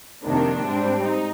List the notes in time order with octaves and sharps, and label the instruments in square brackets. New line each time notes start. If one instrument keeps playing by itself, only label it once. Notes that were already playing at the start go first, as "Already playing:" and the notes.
[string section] F2 C3 D#3 A#3 D4
G#2 G3 C4
D#4